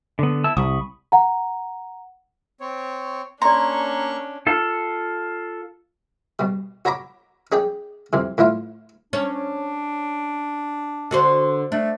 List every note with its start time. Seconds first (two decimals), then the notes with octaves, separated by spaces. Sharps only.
0.19 D3 B3
0.44 E4 A5 E6
0.57 C2 B5 C#6 D#6
1.12 F#5 A#5
2.60 C4 C#5
3.42 A#3 C#4 D4 D5 A#5 C6 C#6
4.47 F4 A4
6.39 B2 G3
6.85 F#4 C#5 A#5 B5 D6
7.52 C#4 G#4 D5 G5
8.13 F2 C3 E3
8.38 A2 E3 E4 F4
9.13 C#4 D4
11.11 D3 F#4 C5
11.72 A3 D4